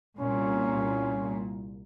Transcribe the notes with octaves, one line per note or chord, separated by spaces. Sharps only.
C2 A#2 C#4